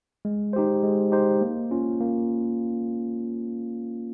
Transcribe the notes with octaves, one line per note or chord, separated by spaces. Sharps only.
G#3
D#4 G4 C5
G#3
D#4 G4 C5
A#3
C#4 F4
A#3